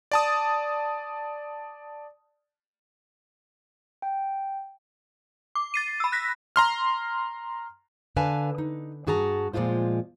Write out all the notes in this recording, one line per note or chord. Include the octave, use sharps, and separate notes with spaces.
D5 A5 D#6
G5
D6
A6 C7 D#7
B5 E6
F#6 A#6 B6
A#5 C6 F6
D3 B4 F5 G#5 A5
D#4
G2 F#4 G#4 A5 A#5
A#2 F3 G#3 F4 C5